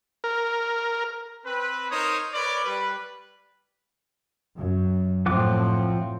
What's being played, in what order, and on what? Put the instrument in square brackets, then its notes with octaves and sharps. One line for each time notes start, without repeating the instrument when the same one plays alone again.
[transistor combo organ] A#4
[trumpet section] C4 B4
D#4 A#4 C5 C#5 A#5 D#6
A#4 B4 C#5 D5
G3 B4
[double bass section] F#2
[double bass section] A2 C4 [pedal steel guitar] F3 F#5 D6